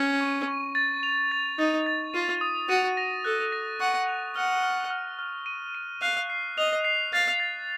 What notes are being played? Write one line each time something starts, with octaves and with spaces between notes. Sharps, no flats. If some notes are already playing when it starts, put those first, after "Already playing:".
Already playing: C#4 D#7
C#6
C#6
A6
F7
A6
D#4 A6
A6
F4 D#7
D#6
F#4 D#7
A#6
A4 F#6
A#6
F#5 C#6
F7
F#5 F6
F6
F6
F6
D#7
D#7
F5 F#6
C7
D#5 F7
C7
F5 A6
A6